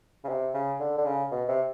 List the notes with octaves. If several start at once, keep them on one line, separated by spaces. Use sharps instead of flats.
C#3
C3
C#3
D3
D3
C#3
B2
C3